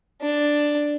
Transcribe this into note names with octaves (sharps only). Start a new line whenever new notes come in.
D4